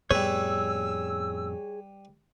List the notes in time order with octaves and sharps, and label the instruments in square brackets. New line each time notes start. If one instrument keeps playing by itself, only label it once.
[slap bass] F2 A2 B3 [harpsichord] G3 B4 [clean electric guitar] G#4 C#5 [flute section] E6